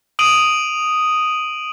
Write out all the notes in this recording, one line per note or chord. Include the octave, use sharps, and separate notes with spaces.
D#6 D7 D#7 F#7